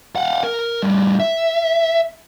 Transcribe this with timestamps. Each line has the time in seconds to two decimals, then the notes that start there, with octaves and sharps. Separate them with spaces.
0.15 F5 F#5
0.43 A#4
0.83 A2 G3
1.19 E5